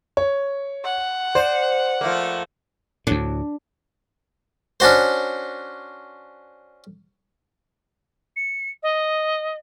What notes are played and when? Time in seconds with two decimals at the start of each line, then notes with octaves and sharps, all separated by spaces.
0.17 C#5
0.84 F#5
1.35 C5 D5
2.01 F3 A3 A#3
3.07 D2 A2 D4
4.80 C#4 D4 F#4 C5
8.36 C#7
8.82 D#5